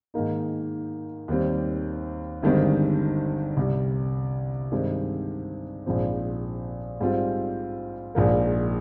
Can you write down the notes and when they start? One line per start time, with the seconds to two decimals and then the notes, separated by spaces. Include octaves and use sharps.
0.14 G#2 D#3 A#3 D#4
1.28 D#2 D#3 G3 C4
2.42 G1 G2 D#3 G#3 C4
3.57 C2 C3 G3
4.72 G2 D#3 G#3 C4
5.86 A#1 G#2 F3 C4
7.01 G#2 G3 C4 F4
8.15 A#1 G#2 F3 A#3